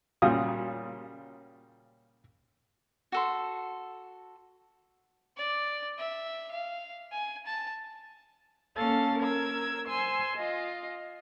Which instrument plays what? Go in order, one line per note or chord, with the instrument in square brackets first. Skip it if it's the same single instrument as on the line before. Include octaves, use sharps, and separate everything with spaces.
[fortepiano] A#2 C#3 G3 F4 F#4 D#6
[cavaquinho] F#4 A4 C6
[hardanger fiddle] D5
E5
F5
G#5
A5
[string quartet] A#3 C#4 A4 F5 A6
A#4 E6 G#6
C5 G#5 C6 E6
F4 D#5